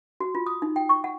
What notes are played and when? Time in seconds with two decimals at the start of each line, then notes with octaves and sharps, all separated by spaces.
0.20 F#4
0.35 F4
0.46 D#6
0.62 D#4
0.76 G5
0.89 C#6
1.04 F#5